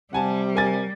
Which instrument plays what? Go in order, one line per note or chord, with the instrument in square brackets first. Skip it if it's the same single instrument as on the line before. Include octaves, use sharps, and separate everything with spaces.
[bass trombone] C3 [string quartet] G3 [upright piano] F#5 G#5 A5
[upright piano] A#4 G#5 A6